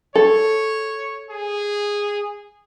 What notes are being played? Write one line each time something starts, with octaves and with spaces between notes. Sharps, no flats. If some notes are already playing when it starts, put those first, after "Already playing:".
A4 C#5
G#4